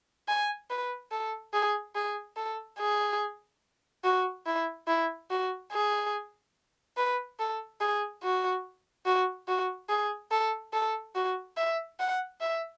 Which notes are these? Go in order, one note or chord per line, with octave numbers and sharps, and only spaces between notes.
G#5
B4
A4
G#4
G#4
A4
G#4
F#4
E4
E4
F#4
G#4
B4
A4
G#4
F#4
F#4
F#4
G#4
A4
A4
F#4
E5
F#5
E5